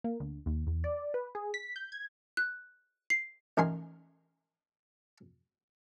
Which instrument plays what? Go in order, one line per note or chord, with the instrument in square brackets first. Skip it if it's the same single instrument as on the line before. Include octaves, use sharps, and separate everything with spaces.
[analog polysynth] A#3
D2
D#2
E2
D5
B4
G#4
B6
G6
G#6
[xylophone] F#6
C7
[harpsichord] A1 D#3 A#4 G#5 C6